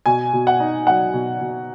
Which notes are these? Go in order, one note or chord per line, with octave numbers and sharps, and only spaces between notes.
B2 G#5
B2
F#5
D#4
F#3 F#5
B2
B2